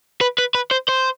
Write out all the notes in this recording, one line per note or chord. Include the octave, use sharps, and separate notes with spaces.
B4
B4
B4
C5
C5